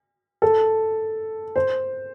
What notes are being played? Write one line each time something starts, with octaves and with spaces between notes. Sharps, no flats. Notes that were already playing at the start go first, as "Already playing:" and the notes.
A4
C5